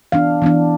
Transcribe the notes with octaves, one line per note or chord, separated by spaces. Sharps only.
E3 B3 D4 F5
E3 B3 D4